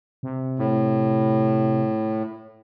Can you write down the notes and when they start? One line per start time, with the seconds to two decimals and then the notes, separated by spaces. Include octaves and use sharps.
0.23 C3
0.59 A2